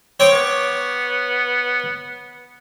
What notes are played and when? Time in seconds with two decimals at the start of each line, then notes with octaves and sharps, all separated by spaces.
0.20 C4 C#5 D6
0.32 B3